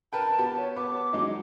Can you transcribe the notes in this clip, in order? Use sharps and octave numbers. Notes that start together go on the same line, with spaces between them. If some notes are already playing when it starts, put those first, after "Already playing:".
A#4 B4 G5 A5
B3 G4
C#5
B3 D6
F#3 G#3 D#4